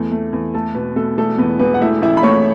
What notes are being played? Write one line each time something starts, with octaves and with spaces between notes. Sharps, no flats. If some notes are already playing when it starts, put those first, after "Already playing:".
Already playing: E2 A3
A3
E2
A3 A4 A5
B2 B3 B4
B2 A3 A4
E1 A3 A4
E2 B3 B4
E1 B3 B4
F#5
A3 E4 E5
A1 E4 E5
B5
A3 C#5 C#6